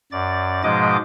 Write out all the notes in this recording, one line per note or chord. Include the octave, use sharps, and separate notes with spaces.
F#2 D5 A6
G#2 B2 F3 G#3 D#5 D6